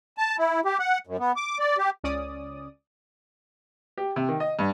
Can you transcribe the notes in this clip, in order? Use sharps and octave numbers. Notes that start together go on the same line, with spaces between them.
A5
E4
G4
F#5
F#2
B3
D6
D5
G4
C#2 C#4 D5 D#6
G4
C3
D#3
D#5
G2